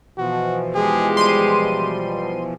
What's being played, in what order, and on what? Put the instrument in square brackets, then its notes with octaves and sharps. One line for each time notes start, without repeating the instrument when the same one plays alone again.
[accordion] B2 E3 F3 [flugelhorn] F#4
[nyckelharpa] G#3 G4 [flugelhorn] G#4
[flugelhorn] G3 [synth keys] C6 D#7